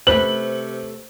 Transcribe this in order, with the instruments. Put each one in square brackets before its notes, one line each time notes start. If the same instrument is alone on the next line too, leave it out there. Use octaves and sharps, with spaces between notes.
[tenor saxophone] C3 [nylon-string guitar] A3 B4 [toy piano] C5 [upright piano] F#7